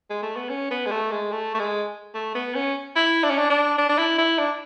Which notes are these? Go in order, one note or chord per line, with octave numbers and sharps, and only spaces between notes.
G#3
A3
B3
C#4
B3
G#3
A3
G#3
A3
A3
G#3
A3
B3
C#4
E4
D4
C#4
D4
D4
D4
D4
E4
E4
D4